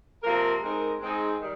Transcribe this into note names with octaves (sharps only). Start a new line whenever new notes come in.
C3 F3 A#3 F4 A#4
G#3 C4 D#4 A#4
G#3 C4 D#4 G#4
D#3 G3